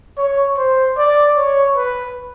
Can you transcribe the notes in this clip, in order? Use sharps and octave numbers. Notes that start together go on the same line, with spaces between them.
C#5
C5
D5
C#5
B4